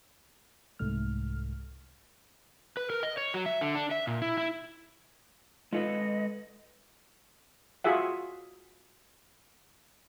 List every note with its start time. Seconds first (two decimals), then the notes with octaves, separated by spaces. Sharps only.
0.79 C2 G#2 A3 F6
2.77 B4
2.90 A#4
3.03 D#5
3.18 C#5
3.34 F#3
3.46 E5
3.61 D3
3.75 D4
3.91 E5
4.07 A#2
4.22 E4
4.38 E4
5.73 G#3 F4 A4 B4 D#5
7.84 F4 F#4 G#4 E5 F#5